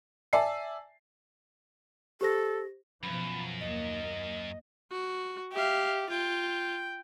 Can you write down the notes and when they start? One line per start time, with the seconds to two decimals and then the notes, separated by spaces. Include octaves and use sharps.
0.33 D5 E5 G#5 A5 E6 C7
2.21 G4 A4 C5 A#6
3.03 F#2 B2 F3 B5
3.60 D#2 A#3 D#5
4.91 F#4
5.52 G4 E5 F5
6.10 F4 G5